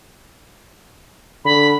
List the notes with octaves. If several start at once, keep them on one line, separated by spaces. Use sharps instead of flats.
D3 B5